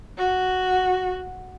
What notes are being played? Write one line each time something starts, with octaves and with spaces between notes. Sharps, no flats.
F#4